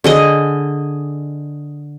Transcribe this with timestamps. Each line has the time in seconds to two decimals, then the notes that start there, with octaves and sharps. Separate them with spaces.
0.04 D3 G#4 D#5